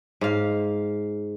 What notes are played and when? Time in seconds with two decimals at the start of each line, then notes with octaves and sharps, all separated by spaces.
0.21 G#2 F5